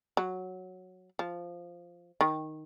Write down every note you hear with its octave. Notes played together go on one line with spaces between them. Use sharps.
F#3
F3
D#3